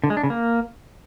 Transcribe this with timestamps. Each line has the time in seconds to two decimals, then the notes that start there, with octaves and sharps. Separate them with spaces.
0.04 D3
0.10 G#3
0.17 D4
0.23 C#3
0.30 A#3